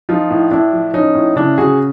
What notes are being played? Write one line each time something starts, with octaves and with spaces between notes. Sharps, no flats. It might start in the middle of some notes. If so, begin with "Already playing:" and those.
F3 D#4 F4
A2
A2 D4 E4
F3
F3 C#4 D#4
A2
C#3 D4 E4
C#3 F#4 G#4